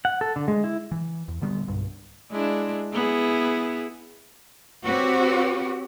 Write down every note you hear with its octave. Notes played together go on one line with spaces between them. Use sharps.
F#5
A4
D3
G#3
E4
E3
E2
A2 D3 G3 B3
B1 G2
G#3 D4 E4
B3 E4 G#4
C4 F#4 G4 B4 C#5